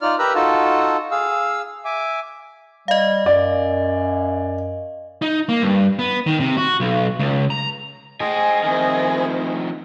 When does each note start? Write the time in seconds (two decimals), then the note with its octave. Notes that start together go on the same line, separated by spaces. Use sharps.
0.01 D#4 F4 D5 F6
0.19 G4 A#4 B4 A#5 E6 F#6
0.35 D#4 F4 F#4 A4 A5
1.11 G#4 F5 E6
1.85 E5 G#5 D6
2.88 G3 D#5 F5
3.26 F#2 D5
5.22 D#4
5.49 A#3
5.62 G2
5.99 B3
6.26 D#3
6.40 C3
6.57 F#4
6.80 B1
7.19 C#2
7.50 A#5
8.21 G#4 C5 D#5 G5 G#5
8.64 F2 D#3 E4 C5